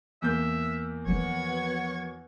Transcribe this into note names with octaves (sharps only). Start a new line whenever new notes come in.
E2 A#3 E5 G6
E3 F3 B3 F#4 C#5 G#6